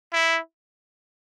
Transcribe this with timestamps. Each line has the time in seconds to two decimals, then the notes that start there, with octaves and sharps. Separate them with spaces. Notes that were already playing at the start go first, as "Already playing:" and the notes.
0.13 E4